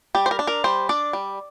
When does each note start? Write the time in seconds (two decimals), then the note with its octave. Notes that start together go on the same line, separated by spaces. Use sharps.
0.15 G3 G4
0.26 C5
0.31 A#4
0.39 D4
0.47 A#4
0.64 G3 C5
0.89 D4 D5
1.13 G3